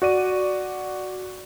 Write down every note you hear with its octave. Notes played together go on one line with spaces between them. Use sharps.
F#4 D5 D#7